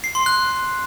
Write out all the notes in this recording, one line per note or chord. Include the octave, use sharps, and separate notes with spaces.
C7
C6
F#6